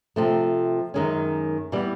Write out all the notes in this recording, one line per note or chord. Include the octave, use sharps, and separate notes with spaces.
C3 F3 A3
F#2 D#3 G#3 C#4
E3 G3 B3